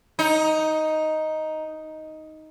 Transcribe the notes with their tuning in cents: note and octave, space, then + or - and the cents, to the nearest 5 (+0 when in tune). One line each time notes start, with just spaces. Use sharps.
D#4 +5